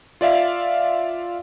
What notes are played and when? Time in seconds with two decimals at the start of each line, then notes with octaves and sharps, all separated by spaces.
0.21 F4 D5 E5 F5